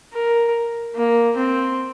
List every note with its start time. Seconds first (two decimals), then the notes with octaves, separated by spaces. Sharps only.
0.13 A#4
0.95 A#3
1.37 C4